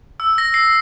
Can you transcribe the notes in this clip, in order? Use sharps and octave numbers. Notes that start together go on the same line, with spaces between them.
E6
A#6
C7